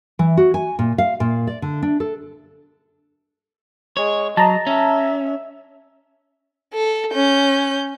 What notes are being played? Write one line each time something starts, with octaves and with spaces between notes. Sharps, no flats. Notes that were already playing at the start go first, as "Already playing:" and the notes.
E3
F#4
G#5
A#2
F5
A#2
D5
D3
D4
A4
G#3 C#5
F#3 D#5 A5 A#5
C#4 E5
A4
C#4 G6